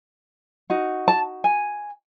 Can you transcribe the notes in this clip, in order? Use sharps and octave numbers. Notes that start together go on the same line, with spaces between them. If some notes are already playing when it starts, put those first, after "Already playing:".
D#4 F#4
A5
G#5